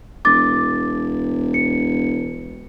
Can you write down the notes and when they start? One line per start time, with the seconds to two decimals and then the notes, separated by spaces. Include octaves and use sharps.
0.25 E1 D6 A6
1.54 C#7